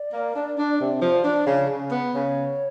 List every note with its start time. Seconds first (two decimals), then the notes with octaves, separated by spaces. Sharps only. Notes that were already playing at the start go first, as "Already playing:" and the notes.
Already playing: D5
0.13 A#3
0.35 D4
0.58 D4
0.80 C3
1.02 F3
1.24 D4
1.47 C#3
1.69 C#3
1.91 B3
2.14 C#3 C#5